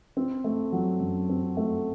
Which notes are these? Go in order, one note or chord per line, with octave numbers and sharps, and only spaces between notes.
C4
A3
F#3
F#2
C4
A3